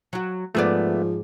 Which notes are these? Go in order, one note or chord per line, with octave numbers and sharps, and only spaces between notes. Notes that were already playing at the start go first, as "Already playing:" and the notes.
F#3 F#4
G#2 F3 A3 B3 G#4 D5